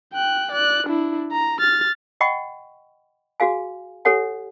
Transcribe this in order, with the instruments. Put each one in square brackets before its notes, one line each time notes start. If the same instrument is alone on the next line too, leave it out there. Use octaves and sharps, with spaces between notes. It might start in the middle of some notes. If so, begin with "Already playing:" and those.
[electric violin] G5 F#6
D5 F#6
D4 E4
A#5
F6 A6
[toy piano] D#5 F#5 G5 B5 C#6
F#4 G#4 F5 G#5
G4 A4 C#5 F#5 G#5